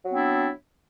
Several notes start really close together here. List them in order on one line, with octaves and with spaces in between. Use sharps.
F#3 B3 C4 D4 E4